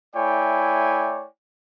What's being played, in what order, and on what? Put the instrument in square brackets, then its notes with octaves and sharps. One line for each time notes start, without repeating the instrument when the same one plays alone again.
[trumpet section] A3 E4 C#5 D5 G5 G#5